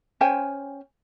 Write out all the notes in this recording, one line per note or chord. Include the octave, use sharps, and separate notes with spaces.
C#4 C5 G5 G#5